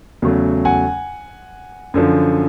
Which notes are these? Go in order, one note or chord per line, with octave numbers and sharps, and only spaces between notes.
E2 C#3 F#3 A3
F#5 G#5
F#2 D3 F3